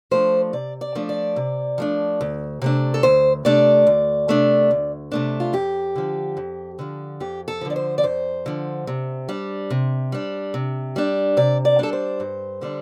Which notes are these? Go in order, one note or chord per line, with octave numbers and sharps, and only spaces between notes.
F3 A3 D4 C5
C3 D5
D5
F3 A3 D4
D5
C3
F3 A3 D4
D2
C3 A3 D4
A4
D2 C5
C3 A3 D4 D5
D2
C3 A3 D4
D2
C3 A3 D4
F4
F2 G4
D3 F3
F2
D3 F3
F2 G4
A4
D3 F3
D5
C5
D5
F2 C5
D3 F3
C3
G3 D4
C3
G3 D4
C3
G3 D4
C3 D5
D5
G3 D4 A4
C5
G2
D3 G3 D4